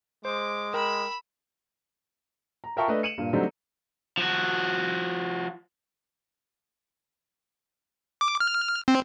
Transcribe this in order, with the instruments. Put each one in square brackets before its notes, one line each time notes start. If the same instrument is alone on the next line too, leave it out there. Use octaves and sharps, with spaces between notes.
[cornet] G#3 [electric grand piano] C5 [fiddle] D6
[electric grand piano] A#4 G5 [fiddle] B5 E6
[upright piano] A#5
F4 A#4 E5 G5 A5 C#6
A3 D4 B4 D#5
C#7 D#7 E7 F#7
G2 A#2 A#3
D3 F#3 G3 A3 C4 D#4
[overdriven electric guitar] F3 F#4
[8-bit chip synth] D6
F6
C4